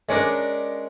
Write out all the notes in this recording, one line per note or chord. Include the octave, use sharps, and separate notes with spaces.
G#3 C#4 D4 A#4